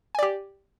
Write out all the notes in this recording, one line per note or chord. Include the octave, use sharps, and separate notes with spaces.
G4 D5 G#5